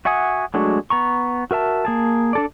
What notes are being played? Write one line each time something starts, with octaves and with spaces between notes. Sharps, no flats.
F#4 E5 F#5 G#5 D#6
F#3 G#3 A3 D4 F#4
B3 A#5 C#6
F#4 A#4 E5 A5
A#3 G#4 A5
D4 A4 D5